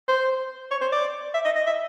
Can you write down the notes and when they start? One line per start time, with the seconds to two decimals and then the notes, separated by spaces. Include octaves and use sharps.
0.08 C5
0.71 C#5
0.81 C5
0.93 D5
1.34 E5
1.45 D#5
1.56 D#5
1.67 E5